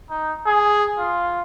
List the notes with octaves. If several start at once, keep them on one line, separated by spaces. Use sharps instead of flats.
D#4
G#4
F4